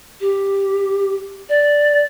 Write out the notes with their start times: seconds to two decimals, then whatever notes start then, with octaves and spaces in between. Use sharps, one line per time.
0.21 G4
1.49 D5